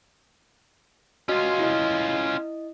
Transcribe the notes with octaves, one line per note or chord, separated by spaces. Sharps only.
C#4 F4 F#4 D#5
E4 D#5